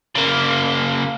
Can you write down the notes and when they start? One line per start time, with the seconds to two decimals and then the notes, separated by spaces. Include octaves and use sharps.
0.15 C#3 A#3